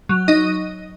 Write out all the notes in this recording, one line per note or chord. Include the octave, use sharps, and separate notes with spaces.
F#3
D#4 D#5